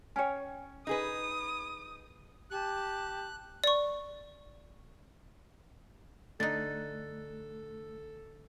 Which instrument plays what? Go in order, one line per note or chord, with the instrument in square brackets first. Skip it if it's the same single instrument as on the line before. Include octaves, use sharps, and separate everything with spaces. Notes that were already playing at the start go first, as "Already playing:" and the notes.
[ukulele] C#4 C#5 [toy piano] G5 G#5
[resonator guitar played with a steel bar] D#4 G#4 B4 [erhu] D#6
[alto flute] G4 [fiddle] A5 [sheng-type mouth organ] F#6
[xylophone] D5 C#6
[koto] D3 D#4 [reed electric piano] A3 F#6 [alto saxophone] A4 [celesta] A6